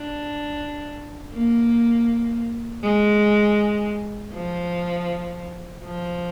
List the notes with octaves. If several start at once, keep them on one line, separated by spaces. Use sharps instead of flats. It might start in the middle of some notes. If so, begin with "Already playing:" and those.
Already playing: D4
A#3
G#3
F3
F3